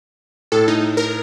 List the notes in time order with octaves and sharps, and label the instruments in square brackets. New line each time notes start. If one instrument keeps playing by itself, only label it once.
[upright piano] A2 [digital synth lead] A4
[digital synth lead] D#4
A#4